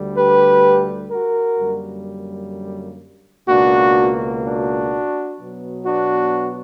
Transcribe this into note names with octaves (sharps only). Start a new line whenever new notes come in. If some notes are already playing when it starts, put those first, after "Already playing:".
Already playing: D2 D3 G3
G4 B4
F#4 A#4
F#2 D3 G3 A#3
C#2 B2 A#3 D4 F#4
D4 F#4
B2 F#3 B3
D4 F#4